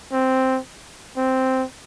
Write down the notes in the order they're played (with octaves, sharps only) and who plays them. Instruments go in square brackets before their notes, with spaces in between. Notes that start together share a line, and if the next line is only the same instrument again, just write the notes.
[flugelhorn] C4
C4